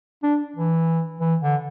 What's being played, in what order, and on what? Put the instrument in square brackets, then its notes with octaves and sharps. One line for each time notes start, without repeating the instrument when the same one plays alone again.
[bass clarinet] D4
E3
E3
D3